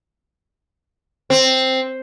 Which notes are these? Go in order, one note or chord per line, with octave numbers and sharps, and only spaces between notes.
C4